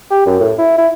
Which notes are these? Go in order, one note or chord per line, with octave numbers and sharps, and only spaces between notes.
G4
F#2
A2
E4
E4